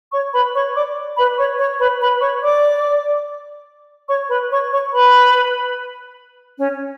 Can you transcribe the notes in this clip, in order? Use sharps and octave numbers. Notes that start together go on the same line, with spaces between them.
C#5 C#6
B4 B5
C#5 C#6
D5 D6
B4 B5
C#5 C#6
C#5 C#6
B4 B5
B4 B5
C#5 C#6
D5 D6
C#5 C#6
B4 B5
C#5 C#6
C#5 C#6
B4 B5
C#4 C#5